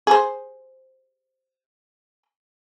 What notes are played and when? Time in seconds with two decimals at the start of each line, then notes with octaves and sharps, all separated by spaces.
0.07 G#4 C5